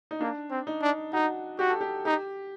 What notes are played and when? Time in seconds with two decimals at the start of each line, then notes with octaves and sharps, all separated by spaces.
0.11 D#4
0.21 A#3 D4
0.51 C4
0.67 D#4
0.82 D4
1.13 D#4 F#4
1.59 F#4 G4
1.70 A4
1.81 G4
2.05 D#4 G4